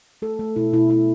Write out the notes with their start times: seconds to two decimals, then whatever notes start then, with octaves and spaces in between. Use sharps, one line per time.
0.22 A3 A4
0.39 A3
0.56 B2 E4
0.73 B2 E4
0.90 A3 E4